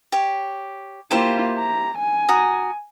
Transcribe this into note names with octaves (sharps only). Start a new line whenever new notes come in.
G4 C#5
A#3 E4 F4 G4 C5
A#5
G#5
F#4 A#5 D#6